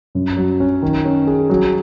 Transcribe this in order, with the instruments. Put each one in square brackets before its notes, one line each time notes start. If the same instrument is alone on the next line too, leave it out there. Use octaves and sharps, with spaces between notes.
[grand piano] F#2
F#3
C#4
D#3
C#4
G#4
F#3